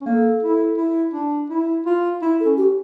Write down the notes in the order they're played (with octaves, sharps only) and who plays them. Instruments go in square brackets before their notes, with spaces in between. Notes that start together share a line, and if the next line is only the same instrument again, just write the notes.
[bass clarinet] C#4
[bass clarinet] A#3 [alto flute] A4
[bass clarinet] E4
E4
D4
E4
F4
E4
[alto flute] A4
[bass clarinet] C#4
[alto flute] G4